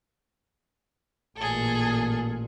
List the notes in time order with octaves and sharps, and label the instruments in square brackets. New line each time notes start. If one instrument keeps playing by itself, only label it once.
[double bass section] A1 A#2 [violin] G#4 A4